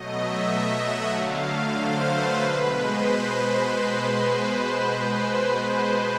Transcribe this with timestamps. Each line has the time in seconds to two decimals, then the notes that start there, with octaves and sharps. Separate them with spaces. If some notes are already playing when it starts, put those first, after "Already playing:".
Already playing: B2 F#3 A3 D#5
0.12 E5
0.78 F#5
1.11 D3 F#3 A3 F5
1.77 C5
2.09 B4
2.42 B2 G#3 B4
2.74 C5